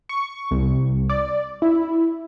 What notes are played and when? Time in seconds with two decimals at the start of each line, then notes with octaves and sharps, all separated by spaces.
0.09 C#6
0.51 C2
1.10 D5
1.62 E4